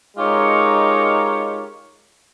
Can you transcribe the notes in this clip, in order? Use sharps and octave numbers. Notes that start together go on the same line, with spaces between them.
G#3 D#4 F4 G4 A#4 C#5